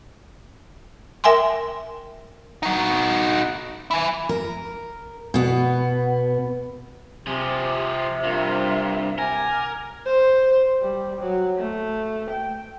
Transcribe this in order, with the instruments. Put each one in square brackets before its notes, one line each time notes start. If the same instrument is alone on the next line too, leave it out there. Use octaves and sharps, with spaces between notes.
[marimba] A#4 E5 G5 G#5 C6
[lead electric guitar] D#4 F#4
E4 G#5
[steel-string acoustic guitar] A#4
B2 B3
[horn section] C3 [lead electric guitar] F3 G#4 [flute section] G4 D6
[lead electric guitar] G2 [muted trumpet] F4 [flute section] A#4 E5 F5
[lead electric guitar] A#4 [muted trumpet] G#5 [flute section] D6
[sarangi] C5
G3
F#3
A3
G5